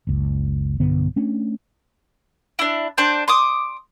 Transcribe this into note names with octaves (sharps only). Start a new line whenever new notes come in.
F#1 C#2
B1 G2 D3 B3
A3 C#4 D4
D4 E4
D4 C5 G5
C6 D6 D#6